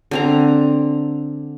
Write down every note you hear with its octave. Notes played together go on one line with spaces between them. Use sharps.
D3 C4 A#5